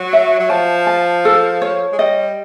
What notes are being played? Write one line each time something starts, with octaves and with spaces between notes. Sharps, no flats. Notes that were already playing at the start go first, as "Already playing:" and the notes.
Already playing: F#3
E5
F#3
F3 A5
A5
A4
C#5
G#3
G3 D#5